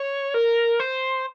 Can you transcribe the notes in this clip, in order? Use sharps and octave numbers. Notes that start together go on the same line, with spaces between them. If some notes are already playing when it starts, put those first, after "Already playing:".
Already playing: C#5
A#4
C5